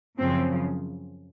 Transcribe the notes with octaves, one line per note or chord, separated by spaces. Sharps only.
F#2 C#3 F3 C4